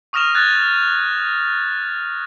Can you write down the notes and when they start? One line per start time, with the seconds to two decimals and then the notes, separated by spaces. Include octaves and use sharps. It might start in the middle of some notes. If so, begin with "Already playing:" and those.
0.13 C#6 D#6 F6 A#6 E7 F7
0.35 F#6 G#6 A6